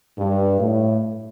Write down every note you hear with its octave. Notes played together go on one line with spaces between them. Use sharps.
G2
A2